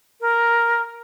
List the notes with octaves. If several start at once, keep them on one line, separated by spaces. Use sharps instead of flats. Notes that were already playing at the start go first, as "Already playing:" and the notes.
A#4